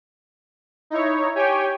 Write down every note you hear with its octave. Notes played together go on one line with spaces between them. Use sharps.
D#4 E4 C#5
G4 C#5 G5 G#5